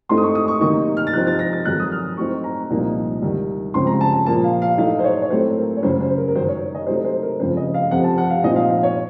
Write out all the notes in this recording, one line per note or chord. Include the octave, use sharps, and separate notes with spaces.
A2 A3 C4 D#4 C6
D#6
C#6
D#6
C#6
C3 D#3 F#3 A#3 D#4 C#6
F6
A6
C3 F3 C4 D#4 F#6
A6
A#6
A6
F2 D#3 F#3 F#6
D#6
F6
A2 F#3 C4 D#4 C#6
A#5
C2 A#2 F3 A#3 D#4
C2 C3 D#3
C#2 C#3 F3 C4 C6
A#5
A5
A5
A#2 F3 A#3 A5
F5
F5
A2 F#3 A3 D#4 F5
C5
C#5
C#5
A2 F#3 A3 C4 C5
A#4
C#5
F#2 C#3 F#3 C5
C5
A#4
A#4
F#2 D#3 F#3 C5
C#5
D#5
C3 F#3 A3 D#4 C5
C5
A#4
F2 C#3 F3 C5
D#5
F5
F2 C3 F3 C4 F#5
A5
F#5
F5
A#2 F3 C4 D#4 D#5
F5
F5
C#5